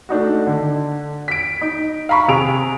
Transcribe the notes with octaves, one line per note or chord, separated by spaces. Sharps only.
A3 D4 D#4 F#4
D3
B6 D7
D#4
F5 A#5 B5 C#6
C3 G#4 D7 F7